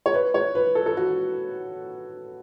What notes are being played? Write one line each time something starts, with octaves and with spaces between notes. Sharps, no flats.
C#5
B4
C#5
B4
A4
A4
F#4